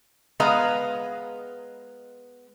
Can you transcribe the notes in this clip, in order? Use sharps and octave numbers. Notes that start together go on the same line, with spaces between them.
G#3 B3 B4 D#5 F5 A#5